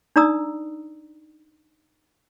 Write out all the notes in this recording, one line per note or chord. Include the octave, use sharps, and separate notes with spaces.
D4 D#4 D5 A#5 D#6 E6